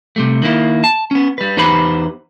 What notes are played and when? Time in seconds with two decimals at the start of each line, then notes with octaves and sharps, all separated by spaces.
0.16 C3 G3 A3
0.42 D#3 A#3 E4
0.84 A5
1.11 B3 C#4
1.38 G3 B4
1.57 E2 D#4 G4 B4 C5 B5